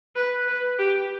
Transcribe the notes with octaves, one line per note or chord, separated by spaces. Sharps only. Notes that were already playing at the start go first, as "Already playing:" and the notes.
B4
B4
G4